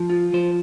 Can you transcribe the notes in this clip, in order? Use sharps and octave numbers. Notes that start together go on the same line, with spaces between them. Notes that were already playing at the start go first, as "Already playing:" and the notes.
Already playing: F3
F4
F3 C5